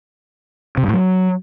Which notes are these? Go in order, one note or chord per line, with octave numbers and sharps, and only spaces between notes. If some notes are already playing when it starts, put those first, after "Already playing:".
C3
G2
A2
F#3